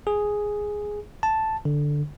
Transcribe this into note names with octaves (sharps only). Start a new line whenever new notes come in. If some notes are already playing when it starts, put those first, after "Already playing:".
G#4
A5
D3